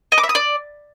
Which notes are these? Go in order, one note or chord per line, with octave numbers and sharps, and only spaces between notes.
D#5
D6
E5
D#6
D5